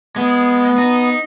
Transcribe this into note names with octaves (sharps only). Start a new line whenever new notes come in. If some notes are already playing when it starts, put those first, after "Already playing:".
G#3 B3
D#4